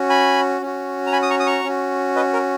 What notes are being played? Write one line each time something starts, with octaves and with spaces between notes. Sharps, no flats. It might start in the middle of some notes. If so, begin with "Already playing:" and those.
Already playing: C#4 F#4
G#5 B5
C#4 F#4
A#5
G#5 B5
D#6
A#5 C#6
D#6
A#5 C#6
C#4 F#4
B4 D#5
A#4